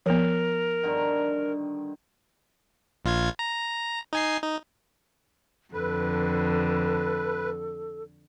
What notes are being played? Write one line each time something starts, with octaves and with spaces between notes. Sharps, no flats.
F3 B3 A#4
G2 D3 D#3
A#1 F4 G#6
A#5
D#4 G#5 C7
D#4
F2 D3 A4 B4